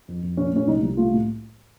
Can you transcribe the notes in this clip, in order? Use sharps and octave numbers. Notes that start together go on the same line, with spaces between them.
F2
F2
A#2 C#4
A3 C#4
C2 D#4
C2
A3 F4
A2